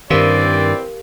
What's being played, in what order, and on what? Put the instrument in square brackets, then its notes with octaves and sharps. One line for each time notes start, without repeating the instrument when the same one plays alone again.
[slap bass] G2 D#3 [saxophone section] E3 C4 [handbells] G4 A#4 F5 [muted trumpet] D5